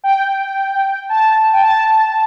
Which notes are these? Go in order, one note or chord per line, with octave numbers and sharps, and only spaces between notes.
G5
A5
G5
A5